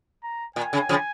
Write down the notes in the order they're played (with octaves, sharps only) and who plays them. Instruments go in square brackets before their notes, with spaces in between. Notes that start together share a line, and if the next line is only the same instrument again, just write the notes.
[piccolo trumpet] A#5
[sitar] A#2 [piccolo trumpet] G#5
[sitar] C#3
C#3 F3